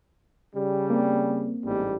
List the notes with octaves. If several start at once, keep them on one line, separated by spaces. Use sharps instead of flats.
C#3 G3
A#3 C4
A1 G#2 G3